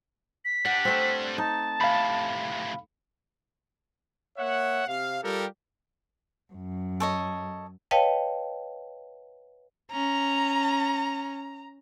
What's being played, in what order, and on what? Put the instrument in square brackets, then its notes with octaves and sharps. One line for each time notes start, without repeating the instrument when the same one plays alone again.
[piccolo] B6
[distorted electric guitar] G3 D4 [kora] F#5
[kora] A3 C4
[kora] D#4 [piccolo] A5
[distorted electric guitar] A2 C3 [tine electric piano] F5 B5
[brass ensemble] A#3 C#5 E5 F#5
C3 F5
G3 F4 G4 A4 A#4
[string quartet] F#2
[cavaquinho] A4 C#5 D#5
[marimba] B4 C#5 D#5 F5 G5 A5
[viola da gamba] C#4 [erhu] A#5